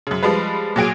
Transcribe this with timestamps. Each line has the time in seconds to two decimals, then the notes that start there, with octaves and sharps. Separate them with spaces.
0.07 F#2 C#3
0.23 F3 G3 G#3 B4
0.76 A#2 F#3 G#4 D7